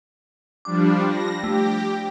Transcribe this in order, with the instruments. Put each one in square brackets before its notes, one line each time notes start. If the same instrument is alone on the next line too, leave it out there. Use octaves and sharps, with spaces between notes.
[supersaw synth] F3 G3 D4 [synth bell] D6
[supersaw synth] A#6
[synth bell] A3 [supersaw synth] G4